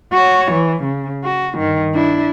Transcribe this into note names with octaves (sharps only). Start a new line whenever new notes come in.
F#4 C#5
E3
C#3
F#4
G2 D#3
D4 E4